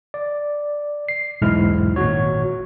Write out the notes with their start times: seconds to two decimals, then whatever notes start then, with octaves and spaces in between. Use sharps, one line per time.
0.14 D5
1.08 C7
1.42 B1 E2 G#2 G#3 E4 F6
1.96 G#1 A#2 F#4 C#5